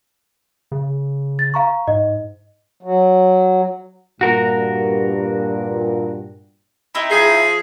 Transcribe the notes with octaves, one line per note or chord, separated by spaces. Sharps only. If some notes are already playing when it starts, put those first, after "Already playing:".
C#3
A6
F5 A#5 C#6
G#2 D#5
F#3
G2 A#2 F#4 A#4
C4 D#4 E4
F3 G#4